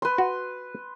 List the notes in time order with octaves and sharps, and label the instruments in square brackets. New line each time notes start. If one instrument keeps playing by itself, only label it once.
[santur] B4 C6
[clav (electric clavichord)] F#4